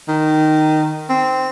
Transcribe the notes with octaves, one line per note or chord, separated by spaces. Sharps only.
D#3
C4